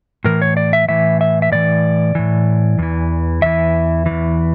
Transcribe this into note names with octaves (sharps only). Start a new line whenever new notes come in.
A2 E3 A#4
C#5
D5
E5
A2 E3 E5
E5
E5
A2 E3 D5
A2 E3
E2 E3
E2 E3 E5
E2 E3